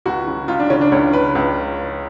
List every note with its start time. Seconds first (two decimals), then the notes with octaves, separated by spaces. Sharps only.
0.06 C#2 F#4
0.27 C#3
0.48 C#2 F4
0.60 D4
0.70 C#3 C#4
0.81 D4
0.92 C#2 C#4
1.13 C#3 B4
1.35 C#2